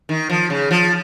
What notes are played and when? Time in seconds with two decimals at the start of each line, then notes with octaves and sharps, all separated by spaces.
0.09 D#3
0.30 F3
0.50 C#3
0.71 F3